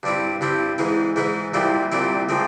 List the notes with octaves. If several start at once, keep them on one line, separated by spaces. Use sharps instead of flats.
G2 G3 C4 E4
G2 G3 C4 E4
G#2 E3 G#3 E4
G#2 E3 G#3 E4
C2 A#2 G3 C4 E4
C2 A#2 G3 C4 E4
A#2 F3 G#3 C4